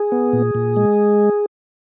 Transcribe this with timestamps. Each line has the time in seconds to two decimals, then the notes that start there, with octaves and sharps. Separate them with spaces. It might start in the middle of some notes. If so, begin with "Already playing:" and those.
Already playing: G#4
0.12 B3
0.33 A#2
0.55 A#2
0.76 G#3